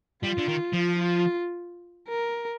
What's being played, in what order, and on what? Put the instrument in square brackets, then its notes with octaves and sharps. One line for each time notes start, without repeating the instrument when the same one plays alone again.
[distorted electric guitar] G3 [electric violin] F4
[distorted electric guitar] D3
D#3
F3
[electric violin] F4
A#4